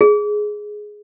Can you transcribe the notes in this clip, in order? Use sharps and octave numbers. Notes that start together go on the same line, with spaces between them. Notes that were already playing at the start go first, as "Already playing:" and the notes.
G#4